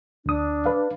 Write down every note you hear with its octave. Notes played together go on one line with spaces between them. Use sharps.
D2 D4 D#6
B4 F5